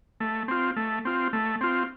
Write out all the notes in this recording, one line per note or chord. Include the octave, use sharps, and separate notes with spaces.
A3
C4 F4
A3
C4 F4
A3
C4 F4